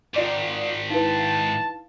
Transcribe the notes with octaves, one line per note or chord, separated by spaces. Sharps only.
G#2 D#3 F4 D5 D6
D#4 E4 B4 F5 A5